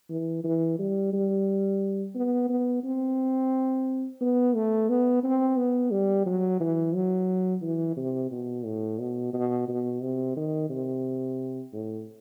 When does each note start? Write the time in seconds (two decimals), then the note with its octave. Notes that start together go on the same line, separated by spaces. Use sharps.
0.10 E3
0.44 E3
0.79 G3
1.13 G3
2.15 B3
2.49 B3
2.84 C4
4.21 B3
4.55 A3
4.89 B3
5.23 C4
5.57 B3
5.91 G3
6.26 F#3
6.60 E3
6.94 F#3
7.62 E3
7.97 C3
8.31 B2
8.65 A2
8.99 B2
9.34 B2
9.68 B2
10.02 C3
10.37 D#3
10.70 C3
11.73 A2